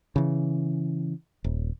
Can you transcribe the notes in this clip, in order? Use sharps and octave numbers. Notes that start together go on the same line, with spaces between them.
C#3 E3
D#1